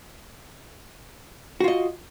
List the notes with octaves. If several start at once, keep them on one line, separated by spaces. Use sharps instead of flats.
F4 F#4 D#5